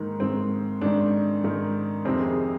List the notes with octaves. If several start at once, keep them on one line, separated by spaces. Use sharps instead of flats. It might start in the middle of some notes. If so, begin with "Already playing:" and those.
Already playing: G#2 D#3 A#3
G#2 D#3 C4
G#2 D#3 D4
G#2 D#3
F2 C3 D#3 C4
G#4